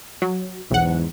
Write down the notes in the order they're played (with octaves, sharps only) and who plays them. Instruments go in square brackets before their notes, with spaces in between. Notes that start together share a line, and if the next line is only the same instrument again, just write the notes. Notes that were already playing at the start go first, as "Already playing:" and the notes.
[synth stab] F#3
[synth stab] B1 F#5 [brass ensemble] E2 G#2